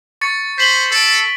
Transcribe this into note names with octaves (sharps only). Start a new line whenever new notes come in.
C#6 A6 C#7
C5 B6 F#7 G7
A4 C#7 D7